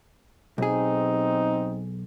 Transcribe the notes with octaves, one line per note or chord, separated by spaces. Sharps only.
B1 C4 D#4 G#4